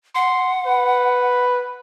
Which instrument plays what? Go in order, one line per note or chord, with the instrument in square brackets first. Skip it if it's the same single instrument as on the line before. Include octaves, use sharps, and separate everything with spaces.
[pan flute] F#5 [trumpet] C6
[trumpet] B4